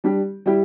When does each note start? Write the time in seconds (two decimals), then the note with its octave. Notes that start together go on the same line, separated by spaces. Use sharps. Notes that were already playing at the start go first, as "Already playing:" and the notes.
0.04 G3 D4 G4
0.46 G3 E4 G4